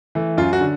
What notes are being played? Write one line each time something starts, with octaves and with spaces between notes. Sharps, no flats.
E3 A3
F#2 F4
F#4
D3